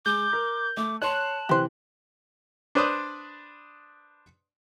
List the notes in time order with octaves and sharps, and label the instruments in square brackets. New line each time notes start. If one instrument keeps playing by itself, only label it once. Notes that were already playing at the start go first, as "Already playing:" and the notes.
[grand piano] G#3 [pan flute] D6 [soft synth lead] G6
[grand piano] A#4
[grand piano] A3 [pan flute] D6
[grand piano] C#5 C6 [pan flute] A5 [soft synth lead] F#6
[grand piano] C3 E3 [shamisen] G4 C5
[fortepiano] D4 B4 C5 D5 C6 D#6